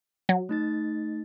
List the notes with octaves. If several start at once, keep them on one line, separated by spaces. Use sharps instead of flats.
F#3
A3 D#4 A6